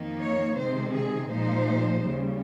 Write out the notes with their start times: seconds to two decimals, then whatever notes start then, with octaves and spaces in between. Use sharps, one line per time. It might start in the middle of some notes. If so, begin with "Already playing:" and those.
Already playing: F2 D#3 A#3 D#4
0.21 C#5
0.57 C3 D#3 G#3 C4 C5
0.94 G#4
1.30 A#2 F3 G#3 D#4 C5
2.04 D#2 C#3 G3